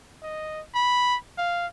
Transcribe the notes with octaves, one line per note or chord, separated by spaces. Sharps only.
D#5
B5
F5